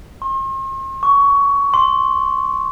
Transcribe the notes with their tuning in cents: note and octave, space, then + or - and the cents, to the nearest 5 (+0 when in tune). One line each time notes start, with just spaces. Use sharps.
C6 +45
C#6 +20
C6 +15